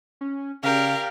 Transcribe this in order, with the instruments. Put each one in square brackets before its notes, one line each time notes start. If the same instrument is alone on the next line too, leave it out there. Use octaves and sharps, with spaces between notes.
[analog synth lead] C#4
[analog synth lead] C#3 [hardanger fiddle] G4 D5 [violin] A#4 [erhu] F5